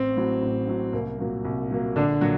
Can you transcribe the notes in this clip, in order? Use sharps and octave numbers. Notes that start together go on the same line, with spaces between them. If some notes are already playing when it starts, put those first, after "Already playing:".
Already playing: A1 C4
A2 F#3
A1
A2 F#3
C2 A#3
A#2 F#3 A#3
C2
A#2 F#3 A#3
A#1 D3 D4
A#2 F#3 F#4